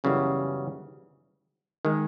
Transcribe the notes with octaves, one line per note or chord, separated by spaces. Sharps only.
F#2 C#3 E3 G3 B3
D#3 G#3